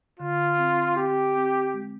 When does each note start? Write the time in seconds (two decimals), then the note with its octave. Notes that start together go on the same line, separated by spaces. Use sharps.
0.19 D3 F4
0.58 C4
0.96 C4 G4
1.35 C4
1.74 G#3